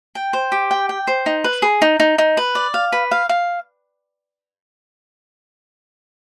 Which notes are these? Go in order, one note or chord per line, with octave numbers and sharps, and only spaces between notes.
G5
C5
G4
G5
G5
C5
D#4
B4
G#4
D#4
D#4
D#4
B4
D5
F5
B4
F5
F5